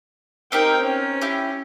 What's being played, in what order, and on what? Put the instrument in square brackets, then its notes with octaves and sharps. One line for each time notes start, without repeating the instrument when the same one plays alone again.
[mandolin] C4 G4 A#4 [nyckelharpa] D#4 G5
[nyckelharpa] C#4
[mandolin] E4 G4